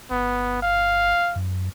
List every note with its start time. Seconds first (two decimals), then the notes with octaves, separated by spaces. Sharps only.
0.11 G1 B3
0.62 F5
1.36 F#2